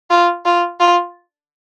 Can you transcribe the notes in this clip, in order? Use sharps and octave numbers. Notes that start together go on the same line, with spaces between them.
F4
F4
F4